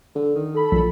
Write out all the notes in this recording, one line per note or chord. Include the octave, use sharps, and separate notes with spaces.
D3
D#3
A4 B5
A#1 A#2